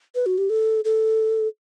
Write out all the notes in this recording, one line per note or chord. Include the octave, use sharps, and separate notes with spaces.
B4
F#4
G4
A4
A4